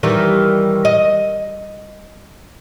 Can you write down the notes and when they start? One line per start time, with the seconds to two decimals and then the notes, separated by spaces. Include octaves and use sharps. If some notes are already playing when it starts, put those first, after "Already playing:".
0.03 D#3 E3 G3
0.85 D#5